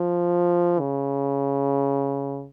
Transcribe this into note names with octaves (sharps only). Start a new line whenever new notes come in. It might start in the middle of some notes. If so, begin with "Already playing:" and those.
Already playing: F3
C#3